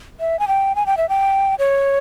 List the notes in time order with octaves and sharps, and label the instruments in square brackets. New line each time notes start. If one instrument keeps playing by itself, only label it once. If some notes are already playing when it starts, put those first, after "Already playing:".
[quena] E5
G#5
G5
G#5
G5
E5
G5
C#5